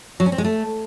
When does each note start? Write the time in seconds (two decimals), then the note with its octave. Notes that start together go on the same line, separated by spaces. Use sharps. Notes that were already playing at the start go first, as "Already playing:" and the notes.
0.20 F#3
0.26 C#4
0.32 C4
0.38 G#3
0.44 A3